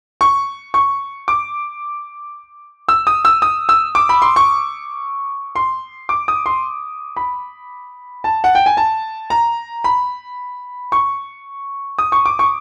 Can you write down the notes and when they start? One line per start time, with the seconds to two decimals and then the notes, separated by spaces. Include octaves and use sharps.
0.21 C#6
0.74 C#6
1.28 D6
2.89 E6
3.07 D#6
3.25 E6
3.42 D#6
3.69 E6
3.95 D6
4.09 B5
4.22 C6
4.36 C#6
5.56 C6
6.09 D6
6.28 D#6
6.46 C6
7.16 B5
8.24 A5
8.44 F#5
8.55 G5
8.66 G#5
8.77 A5
9.30 A#5
9.84 B5
10.92 C#6
11.99 D#6
12.12 C#6
12.26 D6
12.39 C#6